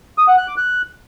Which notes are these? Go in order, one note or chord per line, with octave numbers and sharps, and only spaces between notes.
D#6
F#5
F#6
D6
F#6